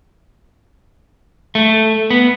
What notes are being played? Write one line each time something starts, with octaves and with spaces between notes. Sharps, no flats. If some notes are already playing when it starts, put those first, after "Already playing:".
A3
B3